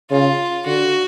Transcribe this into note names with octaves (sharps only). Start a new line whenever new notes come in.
C#3 F4
D3 F#4